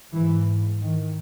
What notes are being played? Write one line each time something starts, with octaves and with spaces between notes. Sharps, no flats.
G#2 E3
D#3